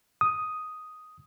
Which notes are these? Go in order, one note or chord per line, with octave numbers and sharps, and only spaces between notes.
D#6